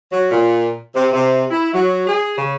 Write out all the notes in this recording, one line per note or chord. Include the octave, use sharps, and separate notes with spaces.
F#3
A#2
C3
C3
E4
F#3
G#4
C#3